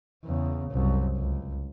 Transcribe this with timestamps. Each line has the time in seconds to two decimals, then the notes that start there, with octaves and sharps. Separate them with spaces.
0.25 E2 C#3
0.71 C2 F#2
1.16 C#2